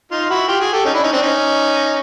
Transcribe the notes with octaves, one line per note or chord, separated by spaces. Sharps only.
D#4 F4
E4 F#4
F4 G4
F#4 G#4
G4 A4
C#4 D#4
D4 E4
C#4 D#4
C4 D4
C#4 D#4